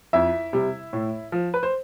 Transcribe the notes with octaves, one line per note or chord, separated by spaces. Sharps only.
F2 E4 E5
C3 G3
A2
F3
B4
C5